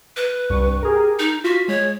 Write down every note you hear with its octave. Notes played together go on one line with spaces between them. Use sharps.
B4
C2 G2 C#6
G4 G#4 A#4
D#4
F4 F#4 B6
G#3 C#5